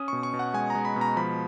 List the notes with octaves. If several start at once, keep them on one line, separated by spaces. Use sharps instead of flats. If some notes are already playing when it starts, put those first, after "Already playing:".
Already playing: C#4 D#6
B2 C#6
C#6
B2
F#5
G#3 G#5
G#3 A#5
B5
B2
A#5
F3 B5